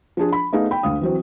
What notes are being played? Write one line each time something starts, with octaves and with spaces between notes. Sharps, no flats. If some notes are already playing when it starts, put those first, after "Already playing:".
F3 D4 G#4
B5
A3 B3 D#4 G#4 F5
G5 B5
D2 D3 F5 D#6
E3 F#3 C4